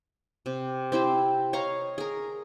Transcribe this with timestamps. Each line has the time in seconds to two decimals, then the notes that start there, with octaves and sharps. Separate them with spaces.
0.46 C3
0.92 C4 E4 G4 C5
1.53 C#5 D#5 F5 A#5
1.98 G#4 A#4